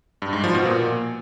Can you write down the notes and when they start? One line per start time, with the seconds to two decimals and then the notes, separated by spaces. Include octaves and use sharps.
0.22 G2
0.33 G#2
0.44 F3
0.54 B2
0.65 A#2